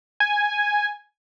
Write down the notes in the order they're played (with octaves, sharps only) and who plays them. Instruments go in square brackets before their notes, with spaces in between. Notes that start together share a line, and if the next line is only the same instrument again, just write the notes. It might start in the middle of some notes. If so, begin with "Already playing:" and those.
[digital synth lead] G#5